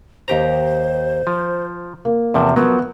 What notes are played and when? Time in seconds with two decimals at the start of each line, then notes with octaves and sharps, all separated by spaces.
0.28 D#2 G4 C5 A#5
1.27 F3
2.05 A#3
2.34 E2 C3 F3 A5
2.56 F3 F#3 B3 A#4